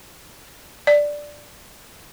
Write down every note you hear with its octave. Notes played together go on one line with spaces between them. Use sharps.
D5